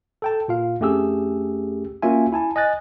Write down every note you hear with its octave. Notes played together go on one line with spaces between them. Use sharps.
A4 G5 A5
A#2 F4 F5
F2 A3 C#4 G4 G#4 E6
A#3 C#4 F4 F#4 E5 G#5
E4 G#5 A5
D#5 G#5 F#6 A6